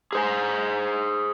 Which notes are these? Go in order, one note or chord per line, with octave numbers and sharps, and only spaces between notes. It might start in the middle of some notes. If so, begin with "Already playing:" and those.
G#4 C5 G#5